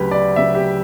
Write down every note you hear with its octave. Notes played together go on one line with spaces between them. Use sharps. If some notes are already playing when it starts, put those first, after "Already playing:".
Already playing: D2 C#3 F#3 G4 B4
D5
D2 C#3 F#3 E5
G4